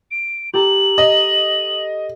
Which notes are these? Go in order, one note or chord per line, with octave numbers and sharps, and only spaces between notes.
D7
G4 A4 A#5 F#7
D#5